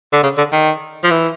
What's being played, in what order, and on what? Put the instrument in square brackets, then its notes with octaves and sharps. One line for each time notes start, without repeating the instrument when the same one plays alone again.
[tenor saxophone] D3
C#3
D3
D#3
F3
E3